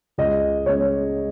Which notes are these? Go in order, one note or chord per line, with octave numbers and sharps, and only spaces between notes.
C#2 D#5
C#3 G#3 C#5